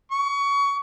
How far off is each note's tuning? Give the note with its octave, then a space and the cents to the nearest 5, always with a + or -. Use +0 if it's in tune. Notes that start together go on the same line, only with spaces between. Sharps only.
C#6 +25